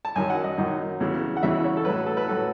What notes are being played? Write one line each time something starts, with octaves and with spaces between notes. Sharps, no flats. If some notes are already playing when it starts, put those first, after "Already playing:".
A5
F#2 D#3 F#3 G#5
F#5
D#5
F#2 D#3 F#3
E2 C#3 E3
F#5
E2 C#3 E3 E5
C#5
A4
A2 F#3 B4
A4
B4
A2 F#3 A4